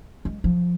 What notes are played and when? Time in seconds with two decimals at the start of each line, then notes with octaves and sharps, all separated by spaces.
0.25 G#3
0.44 F3